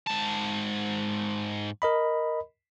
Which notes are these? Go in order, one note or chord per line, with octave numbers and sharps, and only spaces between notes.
G#2 A5
A#4 D#5 B5